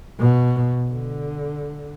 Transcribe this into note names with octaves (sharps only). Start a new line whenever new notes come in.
B2
D3